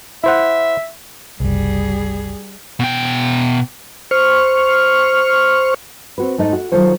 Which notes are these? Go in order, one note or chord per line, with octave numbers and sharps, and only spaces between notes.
E4 C5 E5 F#5
F#1 C2 G3 G#4
B2 G5
C5 C#6 F6
C4 F#4 B4
G#2 A3 D#4 D#5
F#4
D#3 F#3 F4 A4 C5 C#5